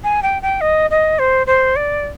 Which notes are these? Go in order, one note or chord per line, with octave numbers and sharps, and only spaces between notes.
G#5
G5
G5
D#5
D#5
C5
C5
D5